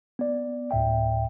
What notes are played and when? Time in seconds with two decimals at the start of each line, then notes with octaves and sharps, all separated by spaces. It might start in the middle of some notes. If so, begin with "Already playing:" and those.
0.19 B3 D5
0.71 D2 A2 E5 G5